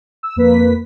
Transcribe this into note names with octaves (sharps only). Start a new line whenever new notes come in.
E6
F2 A#3 B4 B6